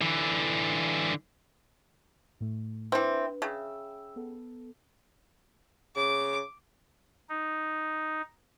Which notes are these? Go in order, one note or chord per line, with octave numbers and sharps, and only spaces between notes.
D3 E3
A2 A3
E3 C4 D4 B4
C#3 E5 G5 E6
B3 A4
C#3 D6
D#4